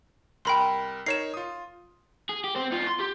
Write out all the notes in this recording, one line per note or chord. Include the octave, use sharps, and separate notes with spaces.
C2 A#4 G5 B5 C6
D#4 A#4 C#5 C7 E7
F4 D#6
G#4
G4
C4 C5
B3 F4
C6
G4